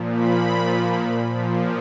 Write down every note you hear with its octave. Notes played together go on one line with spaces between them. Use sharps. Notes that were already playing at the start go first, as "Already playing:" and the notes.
Already playing: A#2 F3
B5
A#2 F3